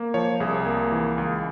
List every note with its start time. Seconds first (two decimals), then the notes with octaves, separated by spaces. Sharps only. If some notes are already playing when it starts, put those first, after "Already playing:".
Already playing: A#3
0.14 F3 C#5
0.40 C2 G#4
0.66 A#3
0.92 E3
1.18 C#2